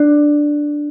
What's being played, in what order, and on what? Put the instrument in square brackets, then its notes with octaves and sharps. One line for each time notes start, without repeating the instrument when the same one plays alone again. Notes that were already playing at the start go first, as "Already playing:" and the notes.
Already playing: [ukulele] D4